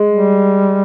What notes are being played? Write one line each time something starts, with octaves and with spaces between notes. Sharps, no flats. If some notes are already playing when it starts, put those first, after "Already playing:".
Already playing: G#3
G3